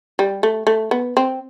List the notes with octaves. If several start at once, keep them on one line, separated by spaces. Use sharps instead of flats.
G3
A3
A3
B3
C4